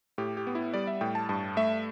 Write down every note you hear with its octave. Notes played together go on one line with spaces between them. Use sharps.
A2 G4
G4
B3
E4
G3 D5
E5
A2 G5
A5
G2 A5
A3 E5